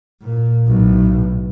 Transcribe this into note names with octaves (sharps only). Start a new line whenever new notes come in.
A#2
B1 A2